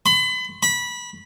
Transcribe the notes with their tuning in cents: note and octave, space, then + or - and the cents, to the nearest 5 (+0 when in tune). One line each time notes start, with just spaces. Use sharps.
B5 +35
B5 -20